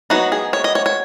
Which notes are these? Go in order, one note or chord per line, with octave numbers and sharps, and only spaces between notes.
F#3 B3 D#4 F#4
G#4
C#5
D#5
C#5
C#5